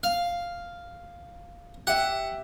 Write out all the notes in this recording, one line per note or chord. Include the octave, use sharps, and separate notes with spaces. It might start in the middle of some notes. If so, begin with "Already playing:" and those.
F5
G4 E5 F#5